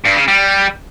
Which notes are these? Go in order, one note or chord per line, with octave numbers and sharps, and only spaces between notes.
G2
C#3
G3